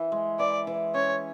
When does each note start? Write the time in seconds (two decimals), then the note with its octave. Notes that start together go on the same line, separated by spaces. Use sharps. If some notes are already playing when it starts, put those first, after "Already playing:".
Already playing: E3
0.12 G#3
0.39 E3 D5
0.67 E3
0.94 C#4 C#5